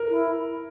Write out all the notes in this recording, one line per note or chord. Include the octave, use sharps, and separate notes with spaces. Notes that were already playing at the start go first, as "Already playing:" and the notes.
Already playing: A#4
E4